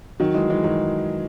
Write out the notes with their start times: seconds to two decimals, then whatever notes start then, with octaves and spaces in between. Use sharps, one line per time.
0.20 D#3 F#3
0.34 E3 G#3
0.50 E3 G#3
0.64 D#3 F#3